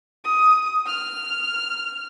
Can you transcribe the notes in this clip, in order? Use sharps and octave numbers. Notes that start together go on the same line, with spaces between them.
D#6
F6